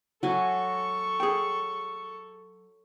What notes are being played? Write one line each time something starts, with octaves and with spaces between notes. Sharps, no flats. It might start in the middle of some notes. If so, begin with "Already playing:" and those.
F#3 A4 G#5 C#6
G#4 G5